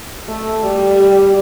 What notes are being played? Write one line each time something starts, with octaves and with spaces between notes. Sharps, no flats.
A3
G3